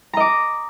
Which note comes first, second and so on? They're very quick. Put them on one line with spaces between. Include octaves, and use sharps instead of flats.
A#5 D#5 D6